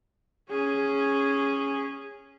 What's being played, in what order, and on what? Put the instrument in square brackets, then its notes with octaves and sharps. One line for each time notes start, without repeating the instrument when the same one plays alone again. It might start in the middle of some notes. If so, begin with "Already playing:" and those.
[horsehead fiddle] C#4 G#4